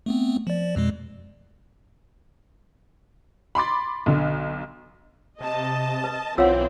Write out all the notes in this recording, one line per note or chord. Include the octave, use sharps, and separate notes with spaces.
A3 B3 C4
F3 D5
F2 B2 G#3
B5 C6 D6 A6
B1 D3
C3 D#5 A5
B4
B1 E3 C4 F4 C#5 F5 F#5 E6